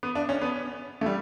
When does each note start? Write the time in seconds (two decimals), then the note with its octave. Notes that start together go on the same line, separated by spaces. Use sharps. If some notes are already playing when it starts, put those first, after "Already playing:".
0.03 B3
0.15 D4
0.29 C#4
0.42 B3
1.01 A3
1.06 G3